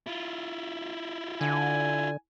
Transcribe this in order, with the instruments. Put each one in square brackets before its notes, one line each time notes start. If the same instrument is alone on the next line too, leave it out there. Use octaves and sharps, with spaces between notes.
[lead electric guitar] E4 F4
[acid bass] D3 [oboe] G#5